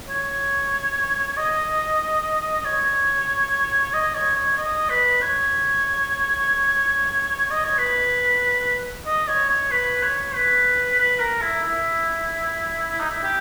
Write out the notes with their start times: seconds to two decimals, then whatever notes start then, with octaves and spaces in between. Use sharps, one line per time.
0.09 C#5
1.37 D#5
2.65 C#5
3.94 D#5
4.15 C#5
4.36 C#5
4.57 D#5
4.89 B4
5.21 C#5
7.51 D#5
7.64 C#5
7.78 B4
9.06 D#5
9.28 C#5
9.49 C#5
9.71 B4
10.02 C#5
10.34 B4
10.98 B4
11.20 A#4
11.41 E4
11.63 E4
12.91 E4
13.00 D#4
13.10 E4
13.23 G4